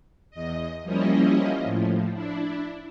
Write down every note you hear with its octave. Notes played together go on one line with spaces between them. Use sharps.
E2 D#5
F3 G3 A#3 C#4 E4 D#5
A2 F3
D4 E4